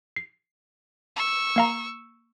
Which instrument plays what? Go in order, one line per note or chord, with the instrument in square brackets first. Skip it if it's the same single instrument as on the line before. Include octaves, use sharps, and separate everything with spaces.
[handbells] C7
[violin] C#6 E6
[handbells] A#3 F5 A#5